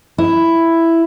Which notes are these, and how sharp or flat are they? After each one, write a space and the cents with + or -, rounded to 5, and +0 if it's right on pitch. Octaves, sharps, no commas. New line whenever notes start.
E4 +5